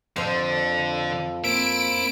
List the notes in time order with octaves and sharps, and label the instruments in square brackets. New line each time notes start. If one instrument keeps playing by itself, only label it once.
[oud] F2 C5 [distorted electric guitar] D3
[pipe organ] A#3 C4 [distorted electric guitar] E4 [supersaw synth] D7